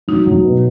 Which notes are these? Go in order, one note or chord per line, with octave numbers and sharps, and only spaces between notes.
F#3 D#4
F#3
B2